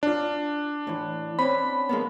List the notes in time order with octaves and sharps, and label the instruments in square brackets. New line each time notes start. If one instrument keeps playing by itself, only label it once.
[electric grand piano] D4 [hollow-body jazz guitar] F4 D5
[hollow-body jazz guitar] A2 E3
[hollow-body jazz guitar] C4 C#4 [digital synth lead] B5
[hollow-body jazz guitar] G#3 A#3 B3